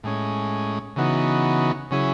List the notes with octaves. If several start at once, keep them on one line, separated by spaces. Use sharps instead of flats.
A2 G#3 C#4
C#3 E3 B3 D#4 F#4
C#3 F#3 C#4 E4 G#4